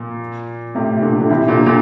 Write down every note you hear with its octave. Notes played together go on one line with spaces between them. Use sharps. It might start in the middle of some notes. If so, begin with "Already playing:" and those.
Already playing: A#2
A2 C3
A#2 D3
D3
C3 E3
A#2 D3
A#2 D3